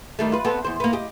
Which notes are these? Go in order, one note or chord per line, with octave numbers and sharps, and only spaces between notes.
D#3 G3 A3
F4 B4
B3 C4 A4
E2 C5
A#3 B3
G4 D#5